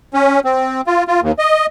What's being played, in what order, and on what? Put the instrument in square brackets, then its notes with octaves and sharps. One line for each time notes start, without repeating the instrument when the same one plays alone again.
[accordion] C#4
C4
F4
F4
D#2
D#5